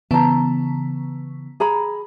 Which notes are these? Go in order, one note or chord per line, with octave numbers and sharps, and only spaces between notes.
C#3 E3 B3 A5 A#5
G#4 A#5 B5